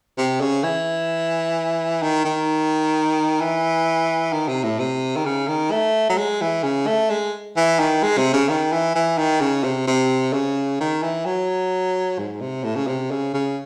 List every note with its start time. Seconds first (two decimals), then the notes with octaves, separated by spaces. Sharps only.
0.18 C3
0.41 C#3
0.64 E3
2.03 D#3
2.25 D#3
3.41 E3
4.33 D#3
4.49 C3
4.64 A2
4.79 C3
5.16 D#3
5.26 C#3
5.48 D#3
5.72 A3
6.09 F#3
6.18 G#3
6.42 E3
6.64 C#3
6.87 A3
7.10 G#3
7.57 E3
7.80 D#3
8.03 G#3
8.18 C3
8.33 C#3
8.49 D#3
8.72 E3
8.95 E3
9.18 D#3
9.41 C#3
9.64 C3
9.87 C3
10.33 C#3
10.80 D#3
11.03 E3
11.26 F#3
12.19 G#2
12.41 C3
12.64 A2
12.76 C#3
12.87 C3
13.11 C#3
13.34 C#3